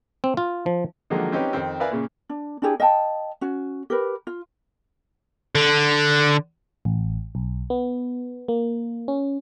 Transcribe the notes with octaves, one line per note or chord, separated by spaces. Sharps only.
C4
F4
F3
D3 D#3 F3 F#3 G#3 A#3
C4 C#4 D#4 G4 B4
F2 D#3 C4
A#4 B4 D5 E5 F5 G#5
A#2 C#3
D4
D4 E4 G4 G#4
D#5 F5 G5 A5
C#4 F#4
G4 A#4 B4
F4
D3
A1
B1
B3
A#3
C#4